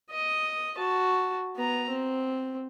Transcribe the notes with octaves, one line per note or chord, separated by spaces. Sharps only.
D#5 D#6
F#4 A5
B3 A#5
C4